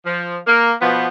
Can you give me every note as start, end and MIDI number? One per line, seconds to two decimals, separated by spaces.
0.05 0.37 53
0.47 0.73 58
0.81 1.07 47
0.81 1.07 53
0.81 1.07 59